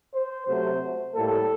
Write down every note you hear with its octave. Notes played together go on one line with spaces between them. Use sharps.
C5
C3 F#3 A3 C5
A2 G3 A#3 A4